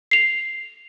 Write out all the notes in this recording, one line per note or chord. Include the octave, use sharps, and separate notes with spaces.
C7 F7